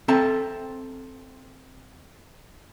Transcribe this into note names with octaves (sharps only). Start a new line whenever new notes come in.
C4 A4 E5 A#5